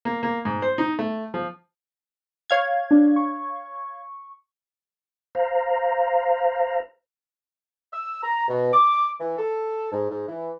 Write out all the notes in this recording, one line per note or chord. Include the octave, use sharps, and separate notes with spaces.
A#3
A#3
G#2
C5
D#4
A3
F3
C#5 F5 G#6
D4
C#6
C5 F5 A#5
E6
A#5
B2
D6
E3
A4
G#2
G#2
E3